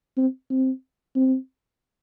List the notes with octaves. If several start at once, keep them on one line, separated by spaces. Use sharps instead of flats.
C4
C4
C4